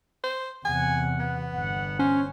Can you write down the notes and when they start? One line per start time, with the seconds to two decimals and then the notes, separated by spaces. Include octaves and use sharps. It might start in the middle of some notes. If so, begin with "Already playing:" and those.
0.24 C5
0.65 E2 C3 F#5 G#5
1.20 B3
1.53 G1 F#5
1.99 C#4 C5